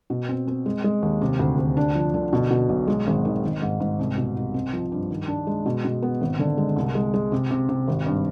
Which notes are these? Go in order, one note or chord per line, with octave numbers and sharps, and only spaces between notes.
B2
C4
C4
G#3
G#3
D#2
C3
D2
D2
D4
F3
D3
B2
B2
B1
G#3
G#1
D#3
D#3
G#2
G#2
C2
B2
C2
C4
F3
G2
D#3
D4
G#3
B2
B2
B3
G#1
D3
G#3
C2
G#3
G#3
C3
C3
C3
G#1
G2